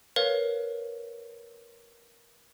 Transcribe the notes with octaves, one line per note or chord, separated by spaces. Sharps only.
A#4 B4 C#5 F5